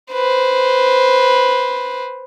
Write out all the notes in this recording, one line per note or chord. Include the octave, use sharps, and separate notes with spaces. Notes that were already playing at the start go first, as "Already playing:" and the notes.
B4 C5